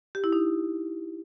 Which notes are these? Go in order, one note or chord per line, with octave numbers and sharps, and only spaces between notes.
G4
E4
D#4